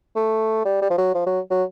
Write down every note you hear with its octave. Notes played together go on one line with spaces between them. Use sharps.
A3
G3
G3
F3
F#3
F3
F#3
F#3